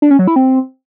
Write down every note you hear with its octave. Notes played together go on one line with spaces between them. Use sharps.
D4
C#4
F#3
E4
C4